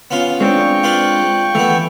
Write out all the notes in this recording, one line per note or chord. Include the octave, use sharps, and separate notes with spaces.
B3 C#4 F4
G#3 C4 D4 G5 C#6
F4 B4 D5
E3 A3 B3